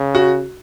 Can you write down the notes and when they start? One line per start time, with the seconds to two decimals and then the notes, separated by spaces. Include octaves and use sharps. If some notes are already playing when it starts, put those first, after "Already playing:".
Already playing: C#3
0.15 F#4